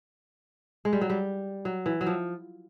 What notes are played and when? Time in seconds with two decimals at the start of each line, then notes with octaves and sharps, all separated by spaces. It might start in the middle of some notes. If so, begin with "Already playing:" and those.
0.85 G#3
0.93 G3
1.01 F#3
1.10 G3
1.65 F#3
1.86 E3
2.01 F#3
2.06 F3